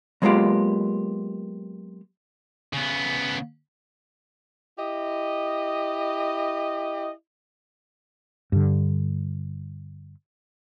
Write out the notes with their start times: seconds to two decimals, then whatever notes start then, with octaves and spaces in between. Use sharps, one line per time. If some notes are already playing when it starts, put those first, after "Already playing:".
0.22 F#3 G#3 A#3 B3 F4 G4
2.73 C#3 B3
4.78 E4 G4 D#5
8.52 G2 D3